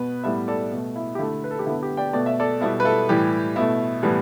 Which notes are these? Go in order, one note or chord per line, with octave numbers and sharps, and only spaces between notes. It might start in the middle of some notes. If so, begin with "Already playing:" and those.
Already playing: B2 B3 B4
A2 G3 B3 B4 E5
A4 D5
B2 A3
E4
G4
D3 A3 E4
B4
A4
G4
D3 B3 E4
G4
D5 G5
B2 A3 D5
E5
A4 D5
B2 G3 B3 E4 A4
B4
E4 A4
A2 E3 G3 G4
B2 A3 E4
A2 E3 G3 B3